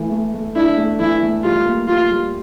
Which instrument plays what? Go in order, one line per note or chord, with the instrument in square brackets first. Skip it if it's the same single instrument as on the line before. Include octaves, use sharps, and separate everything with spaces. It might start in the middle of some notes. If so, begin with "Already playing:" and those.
Already playing: [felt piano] E3 A3
A3
A3
[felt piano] D4 [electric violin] E4
[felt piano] A3
[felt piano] E3 [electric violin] E4
[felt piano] A3
[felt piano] G3 [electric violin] F4
[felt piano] A#3
[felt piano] G3 [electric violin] F4
[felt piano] G3